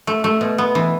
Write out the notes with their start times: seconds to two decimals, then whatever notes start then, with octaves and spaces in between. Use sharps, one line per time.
0.07 A3
0.24 A3
0.41 B2
0.58 B3
0.75 E3